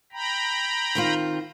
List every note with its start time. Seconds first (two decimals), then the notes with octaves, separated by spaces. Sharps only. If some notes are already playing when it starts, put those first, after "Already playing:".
0.13 G5 A#5 B5
0.95 D#3 C4 F4